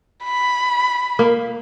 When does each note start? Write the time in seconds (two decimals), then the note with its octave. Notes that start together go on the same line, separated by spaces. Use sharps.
0.24 B5
1.19 A#3